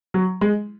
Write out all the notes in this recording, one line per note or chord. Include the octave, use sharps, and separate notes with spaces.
F#3
G#3